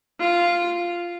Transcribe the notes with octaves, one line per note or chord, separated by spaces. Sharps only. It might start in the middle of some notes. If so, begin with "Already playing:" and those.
F4